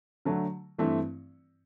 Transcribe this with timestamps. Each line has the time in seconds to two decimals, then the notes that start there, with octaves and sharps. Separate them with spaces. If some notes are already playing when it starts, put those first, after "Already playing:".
0.25 D3 F#3 A3
0.78 G2 E3 A3 C4 E4